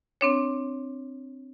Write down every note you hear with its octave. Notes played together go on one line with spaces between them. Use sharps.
C4 D4 C#5